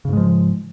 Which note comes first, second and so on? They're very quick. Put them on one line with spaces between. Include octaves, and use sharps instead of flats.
C#3 G#2 G#3 F3